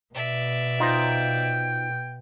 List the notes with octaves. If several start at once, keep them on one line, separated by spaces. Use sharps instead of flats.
B2 D5 E5
D#4 F4 C5 G5